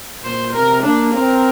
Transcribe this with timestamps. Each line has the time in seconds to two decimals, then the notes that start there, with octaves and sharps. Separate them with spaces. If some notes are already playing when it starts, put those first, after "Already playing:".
0.24 A#2 C5
0.53 C3 A#4
0.83 A#3 D4
1.14 C4 A#4